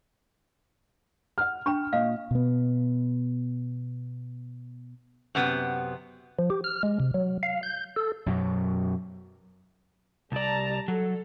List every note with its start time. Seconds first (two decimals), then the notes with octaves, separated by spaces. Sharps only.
1.38 F#5 F6
1.66 D4 G5 B5 C#6
1.93 A#2 D#5 F5
2.31 B2 B3
5.35 F#2 C3 B3
6.39 F3
6.50 G4
6.64 F6
6.83 G#3
7.00 C3
7.14 F#3
7.43 F5
7.63 G6
7.96 A4
8.26 F#2 B2 F#3
10.32 C2 G3 D5 A5 A#5
10.88 F#3 A4